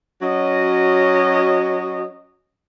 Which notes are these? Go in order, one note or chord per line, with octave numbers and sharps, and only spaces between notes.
F#3 C#4 F#4 D#5